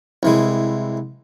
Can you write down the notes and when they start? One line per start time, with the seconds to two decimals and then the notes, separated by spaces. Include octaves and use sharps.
0.23 C2 E3 G#3